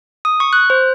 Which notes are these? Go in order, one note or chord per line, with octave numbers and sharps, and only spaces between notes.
D#6
C#6
F#6
C5